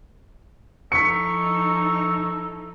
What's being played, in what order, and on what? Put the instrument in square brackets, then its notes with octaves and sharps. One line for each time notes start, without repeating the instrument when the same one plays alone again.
[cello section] F3 D#4 E4 [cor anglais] A4 [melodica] C#6 [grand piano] B6 C#7